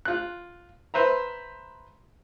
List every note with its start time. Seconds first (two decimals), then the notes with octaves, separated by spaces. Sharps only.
0.05 F4 F#6
0.94 B4 C5 E5 A#5